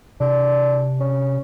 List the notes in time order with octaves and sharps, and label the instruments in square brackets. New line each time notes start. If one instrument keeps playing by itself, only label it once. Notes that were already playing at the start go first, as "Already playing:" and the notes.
[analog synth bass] C3 [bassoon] D4
[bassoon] C#4